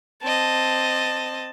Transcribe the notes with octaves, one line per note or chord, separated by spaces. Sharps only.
C4 D#5 A5